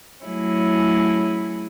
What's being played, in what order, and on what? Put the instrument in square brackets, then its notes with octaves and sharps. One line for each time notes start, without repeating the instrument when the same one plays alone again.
[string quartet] F#3 A3 C#4 E4 G#4